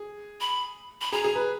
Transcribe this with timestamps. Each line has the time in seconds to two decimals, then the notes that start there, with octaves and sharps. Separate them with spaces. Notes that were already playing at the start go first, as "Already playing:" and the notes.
Already playing: G#4
0.41 B5
1.01 B5
1.12 G#4 A#5
1.24 G#4
1.35 B4